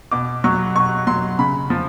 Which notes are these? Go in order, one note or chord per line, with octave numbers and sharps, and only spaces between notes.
B2 D6
F#3 C#6
B2 C#6
F#3 C6
C#3 B5
F3